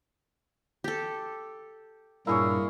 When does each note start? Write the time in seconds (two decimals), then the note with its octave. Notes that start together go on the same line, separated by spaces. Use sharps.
0.84 G4 A4
2.27 G2 A#2 A#3 D4 E4 G#4 C#5